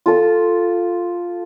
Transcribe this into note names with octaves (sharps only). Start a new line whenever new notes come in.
F4 A4